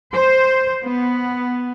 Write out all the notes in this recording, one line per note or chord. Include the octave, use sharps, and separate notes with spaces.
C5
B3